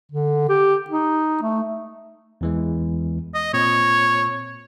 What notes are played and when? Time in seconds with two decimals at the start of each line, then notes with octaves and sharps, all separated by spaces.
0.12 D3
0.49 G4
0.90 D#4
1.42 A3
2.41 E2 E3 G#3
3.34 D#5
3.54 A#2 C4 C#5